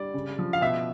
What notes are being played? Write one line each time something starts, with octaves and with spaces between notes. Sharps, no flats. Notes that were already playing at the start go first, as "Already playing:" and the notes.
Already playing: G3 D5
C#3
F3
F5
B2 E5